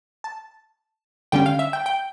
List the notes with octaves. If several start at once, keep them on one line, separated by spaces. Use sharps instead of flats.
A5
D3 G3 C#4 G5
F5
E5
G5
G5